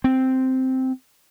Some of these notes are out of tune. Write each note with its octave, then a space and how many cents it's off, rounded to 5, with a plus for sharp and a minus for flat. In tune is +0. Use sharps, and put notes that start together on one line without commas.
C4 -5